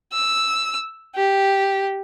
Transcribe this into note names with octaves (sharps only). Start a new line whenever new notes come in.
E6
G4